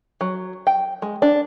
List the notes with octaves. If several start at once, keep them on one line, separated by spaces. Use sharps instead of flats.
F#3
G5
G#3
D4